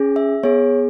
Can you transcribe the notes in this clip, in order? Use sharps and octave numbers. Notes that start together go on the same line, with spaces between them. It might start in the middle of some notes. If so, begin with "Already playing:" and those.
Already playing: C#4 G#4
E5
B3 G#4 C#5